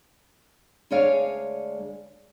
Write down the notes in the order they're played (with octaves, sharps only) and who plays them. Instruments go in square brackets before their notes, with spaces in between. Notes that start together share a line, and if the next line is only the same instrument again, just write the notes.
[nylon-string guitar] D2 G#3 G#4 C#5 D5 F5